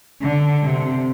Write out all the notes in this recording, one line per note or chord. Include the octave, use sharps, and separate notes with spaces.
D3
C3